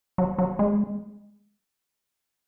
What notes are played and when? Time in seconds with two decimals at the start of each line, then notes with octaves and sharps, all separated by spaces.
0.18 F#3
0.39 F#3
0.59 G#3